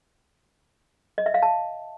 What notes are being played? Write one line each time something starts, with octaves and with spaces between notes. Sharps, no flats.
D#5
E5
F5
A5